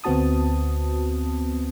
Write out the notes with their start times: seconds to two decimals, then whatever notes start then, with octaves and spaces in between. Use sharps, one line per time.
0.04 D2 B3 C4 F#4 A5 D#6